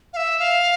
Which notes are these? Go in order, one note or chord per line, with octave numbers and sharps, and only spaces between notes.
F5
E5
F5